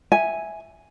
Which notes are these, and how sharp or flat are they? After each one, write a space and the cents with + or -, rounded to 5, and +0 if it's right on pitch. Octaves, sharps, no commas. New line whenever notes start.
E5 -5 G#5 +0